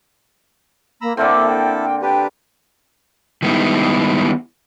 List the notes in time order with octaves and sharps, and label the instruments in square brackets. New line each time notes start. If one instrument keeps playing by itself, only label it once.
[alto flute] A#3 [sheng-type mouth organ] A#5 B5 E6
[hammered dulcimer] D3 A#3 C4 [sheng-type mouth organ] E4 A4 [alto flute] E5
[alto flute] G5
G5
[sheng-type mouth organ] D4 G4 B4 [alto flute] G5
[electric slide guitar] D#3 G3 G#3 B3 D#4 E4